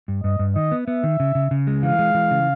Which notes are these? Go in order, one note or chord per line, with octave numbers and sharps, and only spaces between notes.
G2
G2 D#5
G2
D#3 D#5
B3
B3 E5
D#3
C#3
C#3
C#3
G#3
E3 F5
G#3
E3
C#3